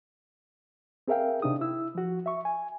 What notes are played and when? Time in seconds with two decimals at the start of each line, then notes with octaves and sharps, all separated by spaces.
1.08 C4 G#4 A#4 E5 F5 G5
1.42 C3 D4 D#4 D#6
1.61 E4 E6
1.95 F3 F#4
2.26 E5 C#6
2.45 G#5